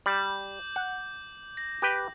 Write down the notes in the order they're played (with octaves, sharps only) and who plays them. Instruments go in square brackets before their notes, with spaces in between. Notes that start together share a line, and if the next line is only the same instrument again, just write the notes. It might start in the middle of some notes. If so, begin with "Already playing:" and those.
[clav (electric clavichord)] G3 [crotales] D6 G6 F#7
[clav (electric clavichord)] F#5
[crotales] A#6
[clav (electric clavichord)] G4 B4 G5